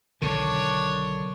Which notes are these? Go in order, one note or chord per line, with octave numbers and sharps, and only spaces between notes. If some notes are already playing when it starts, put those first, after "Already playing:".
B1 D3 D#3 D4 C#5